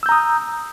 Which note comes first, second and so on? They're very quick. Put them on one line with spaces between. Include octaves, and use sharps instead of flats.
E6 G6 A#5 D#6